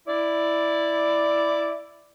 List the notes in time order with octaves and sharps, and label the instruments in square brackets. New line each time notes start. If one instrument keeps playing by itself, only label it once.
[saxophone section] E4 D5